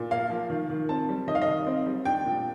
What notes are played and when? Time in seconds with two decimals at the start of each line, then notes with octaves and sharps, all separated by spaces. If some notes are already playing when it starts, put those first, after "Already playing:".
Already playing: A#2
0.11 A#3 F5
0.30 F3
0.50 D#3
0.70 D#3
0.89 C4 A5
1.09 G3
1.27 D#3 D#5
1.35 F5
1.42 D#5
1.47 D#3
1.67 C4
1.86 G3
2.05 D4 G5
2.26 A#2